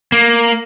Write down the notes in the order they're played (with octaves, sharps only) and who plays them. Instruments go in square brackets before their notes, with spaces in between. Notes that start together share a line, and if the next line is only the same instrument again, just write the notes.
[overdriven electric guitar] A#3